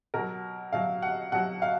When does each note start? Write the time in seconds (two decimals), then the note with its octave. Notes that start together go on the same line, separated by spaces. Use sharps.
0.14 B2 F#3 A#4
0.73 B2 F#3 F5
1.02 F#5
1.32 B2 F#3 F#5
1.62 F5